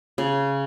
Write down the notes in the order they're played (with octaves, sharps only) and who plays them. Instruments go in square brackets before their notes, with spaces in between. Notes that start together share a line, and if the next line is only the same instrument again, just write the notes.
[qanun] C#3